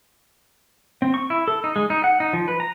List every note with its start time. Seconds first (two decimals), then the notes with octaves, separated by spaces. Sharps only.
1.02 C4
1.14 C#6
1.30 E4
1.48 A4
1.64 D#4
1.76 G#3
1.90 D#4
2.04 F#5
2.20 D#4
2.33 F3
2.48 B4
2.60 A#5